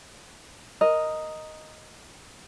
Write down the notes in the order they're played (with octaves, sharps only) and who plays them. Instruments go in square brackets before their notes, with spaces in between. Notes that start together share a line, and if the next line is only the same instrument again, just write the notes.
[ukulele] A#4 D#5